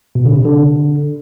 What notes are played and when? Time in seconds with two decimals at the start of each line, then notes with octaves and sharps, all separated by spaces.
0.15 B2
0.25 D3
0.35 C3
0.45 D3